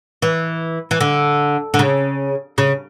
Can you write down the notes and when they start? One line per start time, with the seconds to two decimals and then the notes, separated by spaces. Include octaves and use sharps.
0.22 E3
0.91 E3
1.00 D3
1.74 D3
1.79 C#3
2.58 C#3